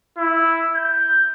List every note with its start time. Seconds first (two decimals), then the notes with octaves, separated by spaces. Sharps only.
0.18 E4
0.76 G6